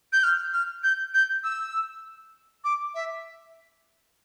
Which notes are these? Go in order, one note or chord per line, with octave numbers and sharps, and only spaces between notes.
G6
F6
F6
G6
G6
E6
D6
E5